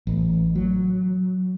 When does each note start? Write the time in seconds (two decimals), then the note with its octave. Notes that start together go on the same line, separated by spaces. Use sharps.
0.07 A1
0.55 F#3